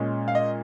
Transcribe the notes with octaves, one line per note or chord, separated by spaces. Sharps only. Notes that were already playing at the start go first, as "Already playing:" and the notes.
Already playing: A#2 G#3 C#4
F5
D#5